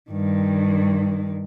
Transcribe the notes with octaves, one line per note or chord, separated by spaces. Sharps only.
G2 D#3